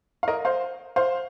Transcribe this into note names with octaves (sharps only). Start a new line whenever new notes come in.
F5
A#4 D#5
C5 F5
C5 F5